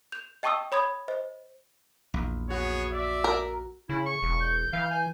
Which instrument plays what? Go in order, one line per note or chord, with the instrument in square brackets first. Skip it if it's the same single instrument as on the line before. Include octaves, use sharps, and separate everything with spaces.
[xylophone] G6 F7
D#5 G5 A5 C#6 D#6 E6
C#5 B5 D#6 G#6
C5 D#5
[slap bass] A#1 E2
[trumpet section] B3 G#4 C#5 [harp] F#4
[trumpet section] D5 E5
[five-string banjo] A#4
[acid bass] C#3 [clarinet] E4
[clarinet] C#6
[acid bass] E1
[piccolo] G6
[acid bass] E3 [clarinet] F5
[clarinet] G#5